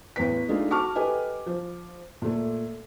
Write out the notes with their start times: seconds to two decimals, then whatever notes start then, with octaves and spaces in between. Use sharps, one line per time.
0.16 A1 E2 B4 B6
0.49 G#3 A3 D4 D#4 F4 G#4
0.70 F#4 A5 C#6 D6 F6
0.95 G4 A4 B4 D#5 G#5
1.47 F3
2.22 A#2 A3